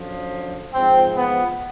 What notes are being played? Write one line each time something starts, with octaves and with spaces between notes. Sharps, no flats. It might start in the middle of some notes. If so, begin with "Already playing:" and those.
Already playing: F#2 D3 F3
G#2 F3 C4
B3